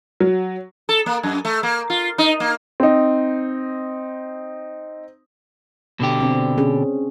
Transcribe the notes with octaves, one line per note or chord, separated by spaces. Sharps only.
F#3
A4
A#3
F#2
A3
A#3
F4
D#4
A#3
C4 D#4
B2 D3 G4
C4 D4
C#4 G#4